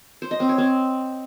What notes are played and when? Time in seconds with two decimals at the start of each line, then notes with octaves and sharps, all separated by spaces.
0.22 C5
0.31 D#5
0.40 C4
0.49 C#5
0.58 C4